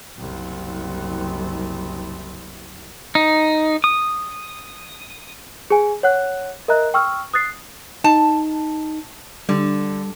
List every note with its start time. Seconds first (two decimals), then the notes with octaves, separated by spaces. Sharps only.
0.18 F#1 C2
3.15 D#4
3.84 D#6
5.70 G#4 G#5
6.03 C#5 F#5 F#6
6.68 A#4 D#5 E5 A#5 F#6
6.94 G5 C#6 E6 F6
7.34 D#6 F#6 A6 C7
8.04 D#4 A5
9.49 D3 G3